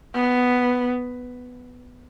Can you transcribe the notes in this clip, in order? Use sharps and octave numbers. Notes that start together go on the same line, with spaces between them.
B3